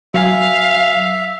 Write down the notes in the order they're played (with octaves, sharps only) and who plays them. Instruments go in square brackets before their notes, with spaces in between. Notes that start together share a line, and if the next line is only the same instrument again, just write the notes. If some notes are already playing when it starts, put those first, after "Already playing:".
[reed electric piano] F#3 G#5 [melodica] E5 [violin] F5